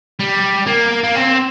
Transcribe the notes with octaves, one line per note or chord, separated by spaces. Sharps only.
G3
A#3
A#3
C4